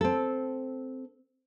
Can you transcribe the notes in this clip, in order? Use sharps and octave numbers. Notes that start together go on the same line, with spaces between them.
C4 A4